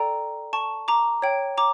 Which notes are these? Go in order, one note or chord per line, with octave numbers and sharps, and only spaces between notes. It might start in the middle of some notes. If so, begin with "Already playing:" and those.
Already playing: A4 D5 G5 A#5
A5 C#6
A#5 D6
C#5 G5
A#5 D6